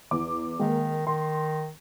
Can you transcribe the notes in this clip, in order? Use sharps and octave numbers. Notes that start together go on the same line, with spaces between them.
E2 D6
D#3 G#3 A#3
D#3 C6